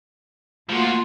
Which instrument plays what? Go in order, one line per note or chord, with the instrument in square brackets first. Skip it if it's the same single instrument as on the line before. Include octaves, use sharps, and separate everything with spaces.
[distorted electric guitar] F3 F#4 [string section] A3 A#3 F4